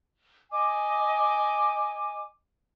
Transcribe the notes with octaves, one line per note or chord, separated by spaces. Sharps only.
D#5 G#5 D6